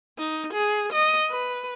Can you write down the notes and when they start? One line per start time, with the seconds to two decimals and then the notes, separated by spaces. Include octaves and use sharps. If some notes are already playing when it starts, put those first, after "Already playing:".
0.18 D#4
0.53 G#4
0.92 D#5
1.30 B4